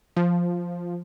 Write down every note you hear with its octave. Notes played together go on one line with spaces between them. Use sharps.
F3